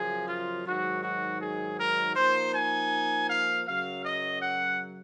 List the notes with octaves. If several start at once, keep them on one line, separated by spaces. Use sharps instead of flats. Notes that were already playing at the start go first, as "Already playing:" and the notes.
Already playing: F#2 C#3 F3 G#4
F4
G#2 D#3 F#3 F#4
F#4
G#4
A#4
F3 A#3 D#4 C5
G#5
F5
F#2 C#3 F#3 F5
D#5
F#5